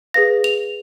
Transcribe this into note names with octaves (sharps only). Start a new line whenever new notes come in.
G#4 B4 F5 A#6
F7